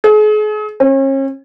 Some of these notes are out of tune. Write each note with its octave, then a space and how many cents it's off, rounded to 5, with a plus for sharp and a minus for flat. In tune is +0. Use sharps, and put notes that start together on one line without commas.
G#4 +40
C#4 -40